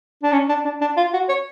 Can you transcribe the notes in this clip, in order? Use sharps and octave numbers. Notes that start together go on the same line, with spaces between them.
D4
C#4
D4
D4
D4
F4
F#4
C#5